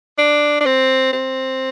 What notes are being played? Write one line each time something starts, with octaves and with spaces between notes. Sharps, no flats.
D4
D4
C4
C4